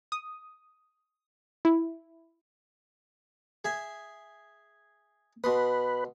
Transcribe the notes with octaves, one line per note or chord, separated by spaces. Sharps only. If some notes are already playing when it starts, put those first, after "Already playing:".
D#6
E4
G#4 E5 G#5
B2 B4 C6 D#6